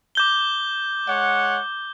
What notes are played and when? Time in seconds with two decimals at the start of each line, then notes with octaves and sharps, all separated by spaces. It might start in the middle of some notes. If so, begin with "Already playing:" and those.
0.15 D6 G6 G7
1.08 G#3 C#5 F#5